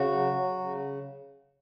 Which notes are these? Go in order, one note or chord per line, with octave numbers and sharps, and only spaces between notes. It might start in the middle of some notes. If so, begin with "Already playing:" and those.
Already playing: C#3 F#4
F#3
F#3
C#3